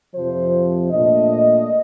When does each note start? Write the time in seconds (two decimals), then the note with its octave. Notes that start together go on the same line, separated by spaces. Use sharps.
0.14 F2 C3 F3 C5
0.92 A#2 A3 D4 D#5